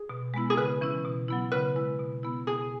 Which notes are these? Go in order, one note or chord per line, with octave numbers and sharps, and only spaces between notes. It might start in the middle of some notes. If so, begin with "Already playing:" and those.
Already playing: G#4
B2
G#3 B3 E4
G#4
C#3 B4
E3 C#4 E4
B2
F#3 B3 E4
C#3 B4
G#3 E4
B2
B3 E4
B2 G#4